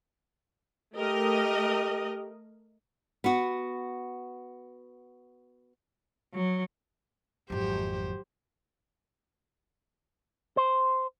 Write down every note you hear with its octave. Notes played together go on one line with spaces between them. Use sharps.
A3 G4 A#4 D#5
B3 F#4
F#3
G#1 F2 F#3 G4 C5
C5